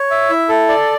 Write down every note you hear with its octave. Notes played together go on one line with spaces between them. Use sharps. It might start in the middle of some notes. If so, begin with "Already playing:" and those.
Already playing: C#5
E5
E4
A4
D5